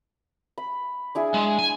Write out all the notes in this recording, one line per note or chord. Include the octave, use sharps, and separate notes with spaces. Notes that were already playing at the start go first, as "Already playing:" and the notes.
B5
D4 E4 G#4
G#3
G#5